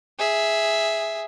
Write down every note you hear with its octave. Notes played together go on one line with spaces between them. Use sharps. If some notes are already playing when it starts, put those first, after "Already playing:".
G#4 E5